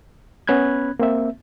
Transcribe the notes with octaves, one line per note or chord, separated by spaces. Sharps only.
B3 C#4 B5 F#6 G#6
A#3 C4 E5